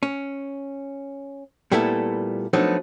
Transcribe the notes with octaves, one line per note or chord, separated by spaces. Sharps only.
C#4
A#2 G3 A3 B3 E4 A4
F3 F#3 A3 B3 D4 D#4